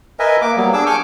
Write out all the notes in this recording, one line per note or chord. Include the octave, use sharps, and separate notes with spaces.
A#4 B4 D#5 E5 G#5
A#3 D6
F#3 G3 A#3 B3
D4 G#4 D6 E6
G#5 C#6 D6 F6 G6